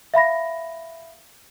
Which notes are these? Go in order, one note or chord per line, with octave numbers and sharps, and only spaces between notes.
E5 F5 B5 A#6